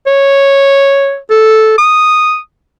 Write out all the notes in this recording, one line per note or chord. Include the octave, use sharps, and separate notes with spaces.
C#5
A4
D#6